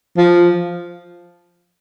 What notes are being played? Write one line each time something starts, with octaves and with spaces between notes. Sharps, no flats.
F3